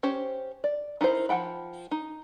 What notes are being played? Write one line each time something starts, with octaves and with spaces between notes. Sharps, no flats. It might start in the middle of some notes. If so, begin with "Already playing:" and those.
C#4 G4 C5
D5
D#4 E4 A#4 C5
F3 F#5 G5 B5
D#4